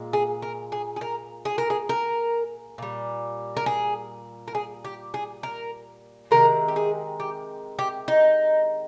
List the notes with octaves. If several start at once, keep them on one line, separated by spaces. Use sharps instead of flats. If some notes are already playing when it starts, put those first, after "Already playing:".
Already playing: A#2 G#3
G#4
A#4
G#4
G#4
A#4
G#4
A#4
G#4
A#4
A#2 G3
A#4
G#4
A#4
G#4
G4
G#4
A#4
C3 D#3 G#3 A#4
G4
G#4
G4
G4
D#4